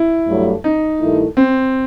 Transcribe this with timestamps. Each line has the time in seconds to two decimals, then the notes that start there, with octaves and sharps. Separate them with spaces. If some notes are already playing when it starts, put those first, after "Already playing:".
Already playing: E4
0.28 G2 F#3 A3
0.64 D#4
1.01 G2 D#3 A3 E4
1.37 C4